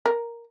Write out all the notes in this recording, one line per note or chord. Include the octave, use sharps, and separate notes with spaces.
A#4